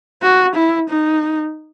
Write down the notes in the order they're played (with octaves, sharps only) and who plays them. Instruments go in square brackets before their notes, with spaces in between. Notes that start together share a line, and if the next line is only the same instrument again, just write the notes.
[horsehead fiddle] F#4
E4
D#4